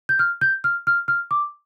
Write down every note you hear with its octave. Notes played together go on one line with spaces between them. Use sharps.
G6
F6
G6
F6
F6
F6
D6